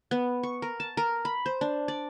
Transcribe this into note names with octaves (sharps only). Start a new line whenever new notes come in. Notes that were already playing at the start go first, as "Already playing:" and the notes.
B3
C#6
A#4
A5
A#4
B5
C5
D4
D5